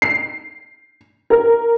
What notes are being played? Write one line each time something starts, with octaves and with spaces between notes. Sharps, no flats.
C7
A#4